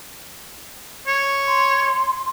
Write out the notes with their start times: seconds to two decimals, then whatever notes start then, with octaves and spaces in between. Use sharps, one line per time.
1.07 C#5
1.47 C6